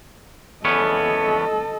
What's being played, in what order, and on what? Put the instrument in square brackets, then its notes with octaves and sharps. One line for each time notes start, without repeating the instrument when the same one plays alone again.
[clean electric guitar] E2 B3 C#4 [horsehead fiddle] A4 D#5